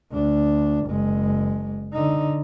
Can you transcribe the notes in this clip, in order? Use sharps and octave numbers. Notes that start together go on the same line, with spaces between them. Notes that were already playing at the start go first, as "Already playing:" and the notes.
D2 D4
F#1 G#3
D3 D#4